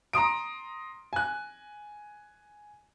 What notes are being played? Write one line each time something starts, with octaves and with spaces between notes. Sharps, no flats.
A#5 C6 D#6 D7
G#5 F#6